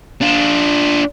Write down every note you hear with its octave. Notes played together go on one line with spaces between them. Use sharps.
D4 F4